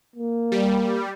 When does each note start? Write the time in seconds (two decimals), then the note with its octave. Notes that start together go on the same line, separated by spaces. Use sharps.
0.16 A#3
0.52 G3